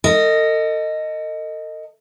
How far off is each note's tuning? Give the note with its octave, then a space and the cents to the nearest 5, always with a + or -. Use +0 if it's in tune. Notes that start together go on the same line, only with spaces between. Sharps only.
A4 +45 D#5 +0